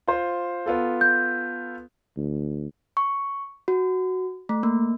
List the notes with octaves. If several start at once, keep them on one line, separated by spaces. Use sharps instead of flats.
F4 C5
B3 F4 A4
G6
D2
C#6
F#4
A3
A#3